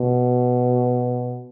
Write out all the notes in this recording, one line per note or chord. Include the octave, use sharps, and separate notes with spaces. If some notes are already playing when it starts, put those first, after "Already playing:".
Already playing: B2